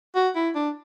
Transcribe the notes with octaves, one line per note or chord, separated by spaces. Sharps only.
F#4
E4
D4